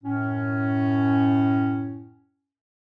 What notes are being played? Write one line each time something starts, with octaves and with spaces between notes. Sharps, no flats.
F#2 A2 C#4